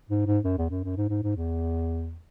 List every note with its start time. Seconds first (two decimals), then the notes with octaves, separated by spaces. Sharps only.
0.10 G#2
0.27 G#2
0.44 F#2
0.57 E2
0.70 F#2
0.84 F#2
0.97 G#2
1.09 G#2
1.23 G#2
1.36 E2